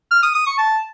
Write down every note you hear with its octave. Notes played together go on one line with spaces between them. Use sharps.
F6
D#6
D#6
C#6
A5